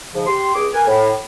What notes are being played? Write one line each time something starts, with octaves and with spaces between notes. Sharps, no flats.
G#2 C#3 F3
G4 C6
C#2 G#4 D6
A#4 B4 G#5
A2